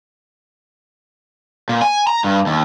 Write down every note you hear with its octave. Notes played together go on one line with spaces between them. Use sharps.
A#2
G#5
A#5
G2
D#2